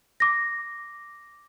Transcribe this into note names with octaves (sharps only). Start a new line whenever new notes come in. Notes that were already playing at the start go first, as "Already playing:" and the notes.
D6 A#6